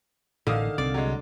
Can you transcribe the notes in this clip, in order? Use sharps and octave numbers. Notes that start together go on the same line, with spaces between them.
A1 A2 D3 D#3 F5 D#6
C2 C4 D5
F#3 G#3